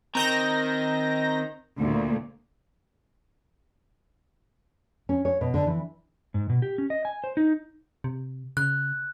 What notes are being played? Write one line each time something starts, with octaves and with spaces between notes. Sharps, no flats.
D#3 C4 A#5 G6 A#6
D2 A#2
C#4
C#5
B2
D3
E3
G#2
B2
G4
C#4
D#5
G#5
C5
D#4
C3
C#3 F#6